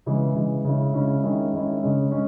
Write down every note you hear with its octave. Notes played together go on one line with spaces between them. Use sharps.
C#3 E3 G#3
C#3 E3 G#3
C#3 G#3 C#4 E4
C#3 G#3 C#4 E4
D#3 G#3 C#4 E4
D#3 G#3 C#4 E4
C#3 G#3 C#4
G#3 C#4